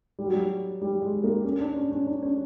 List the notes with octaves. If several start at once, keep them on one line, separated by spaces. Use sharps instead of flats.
G3
F#3
G3
G3
G#3
A#3
C#4
D4
C#4
C#4
D4
C#4